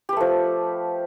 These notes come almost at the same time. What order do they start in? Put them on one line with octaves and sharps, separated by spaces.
G4 B4 A3 F3